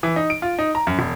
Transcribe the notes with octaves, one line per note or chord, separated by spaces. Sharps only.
E3
D#4
D7
F4
D#4
A#5
F#2
E1